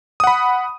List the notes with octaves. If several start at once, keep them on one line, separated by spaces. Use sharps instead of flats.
F#5 B5 D#6